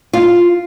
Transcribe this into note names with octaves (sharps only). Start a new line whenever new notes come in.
F4